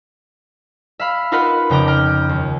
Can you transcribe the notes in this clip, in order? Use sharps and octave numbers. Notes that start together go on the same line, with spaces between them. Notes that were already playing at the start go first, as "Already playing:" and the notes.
E5 F5 B5
D#4 F4 A#4 B4 F#5 B5
F2 C#3 G5 A#5 D6
G5 A#5 F6
D#2